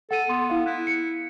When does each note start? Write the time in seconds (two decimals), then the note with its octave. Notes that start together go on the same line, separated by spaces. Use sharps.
0.11 A4 F#5 D#7
0.29 B3 C6
0.50 E4 F5
0.66 E4 F#6
0.87 C#7